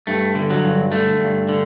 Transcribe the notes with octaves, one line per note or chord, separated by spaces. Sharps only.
G2 A3
D3
F#3
G2
D3 A3
G2
D3